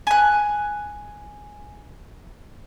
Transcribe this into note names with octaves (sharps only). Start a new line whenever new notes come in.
G#5 F#6